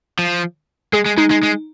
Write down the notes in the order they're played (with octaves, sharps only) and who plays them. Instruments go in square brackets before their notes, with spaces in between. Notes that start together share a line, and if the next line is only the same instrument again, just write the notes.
[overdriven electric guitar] F3
[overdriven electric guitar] G#3 [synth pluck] G#4
[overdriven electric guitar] G#3
[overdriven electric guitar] G#3 [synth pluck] D#4
[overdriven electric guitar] G#3
G#3